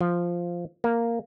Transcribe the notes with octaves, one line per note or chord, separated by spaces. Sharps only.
F3
A#3